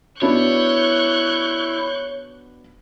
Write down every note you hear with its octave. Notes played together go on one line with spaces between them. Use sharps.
B3 D4 E4 F#4 C#5 C#6 F#6 G6